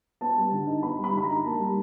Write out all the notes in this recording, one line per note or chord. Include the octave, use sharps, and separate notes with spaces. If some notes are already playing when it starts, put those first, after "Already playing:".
B3 A5
G3
D3
D#4
B3 B5
G3
B5
D3 B5
A#5
D#4
A#3 A5
G3